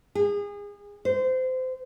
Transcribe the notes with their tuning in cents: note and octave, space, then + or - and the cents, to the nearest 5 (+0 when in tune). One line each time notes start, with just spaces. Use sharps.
G#4 -30
C5 -25